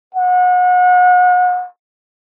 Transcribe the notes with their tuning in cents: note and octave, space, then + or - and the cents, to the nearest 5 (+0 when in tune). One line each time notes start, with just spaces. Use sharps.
F#5 -35